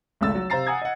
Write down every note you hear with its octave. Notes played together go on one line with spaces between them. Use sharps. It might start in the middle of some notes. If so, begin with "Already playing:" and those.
G#1 C#2 A3 E6 A6
F#3
C3 C5 F5 A#5 A6 C7
F#5 G#5 A#5 D#6 G#6
D#5 F#5